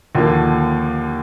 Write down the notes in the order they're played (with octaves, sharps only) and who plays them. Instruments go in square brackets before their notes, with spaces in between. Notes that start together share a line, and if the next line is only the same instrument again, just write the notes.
[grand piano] D#2 D3 F3 A#3